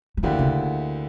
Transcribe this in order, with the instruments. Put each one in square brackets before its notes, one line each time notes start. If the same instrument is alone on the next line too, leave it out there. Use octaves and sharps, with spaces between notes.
[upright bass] F#3
[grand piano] D2 D3 A#3 E4 G4 [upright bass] E3
[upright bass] C#3